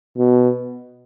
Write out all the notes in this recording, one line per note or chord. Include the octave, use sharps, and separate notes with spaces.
B2